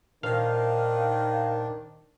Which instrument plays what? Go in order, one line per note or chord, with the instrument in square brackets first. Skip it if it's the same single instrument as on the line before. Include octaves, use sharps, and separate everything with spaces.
[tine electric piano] A#2 A#4 C5 [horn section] D#3 [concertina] D4 [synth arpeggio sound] F5